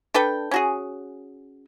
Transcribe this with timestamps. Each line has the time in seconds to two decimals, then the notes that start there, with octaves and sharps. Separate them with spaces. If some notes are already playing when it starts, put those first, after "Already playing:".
0.14 D4 A4 B4 G5
0.51 C#4 F#4 G#4